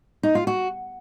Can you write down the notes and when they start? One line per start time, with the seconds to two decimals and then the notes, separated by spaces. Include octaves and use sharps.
0.23 D#4
0.35 F4
0.47 F#4